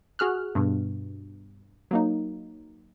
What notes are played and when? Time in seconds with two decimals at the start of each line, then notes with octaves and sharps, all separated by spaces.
0.19 F#4 G#4 F6 F#6
0.55 G2 B2
1.91 F#3 A#3 D#4